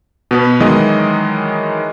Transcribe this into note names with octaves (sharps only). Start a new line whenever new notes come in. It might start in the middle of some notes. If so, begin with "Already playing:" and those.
B2 B3 B4
D#3 E3 F#3 G#3 D#5